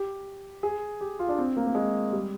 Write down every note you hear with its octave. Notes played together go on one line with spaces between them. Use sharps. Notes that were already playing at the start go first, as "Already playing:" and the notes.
Already playing: G4
G#4
G4
F4
D4
C4
A#3
A#3
G#3
G3